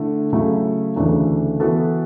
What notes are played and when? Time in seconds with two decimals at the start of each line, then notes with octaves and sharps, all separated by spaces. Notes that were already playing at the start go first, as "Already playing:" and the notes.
Already playing: D3 A3 E4
0.33 C#3 F#3 A3 E4
0.96 D2 C#3 E3 A3 D4
1.60 E3 B3 F#4 A4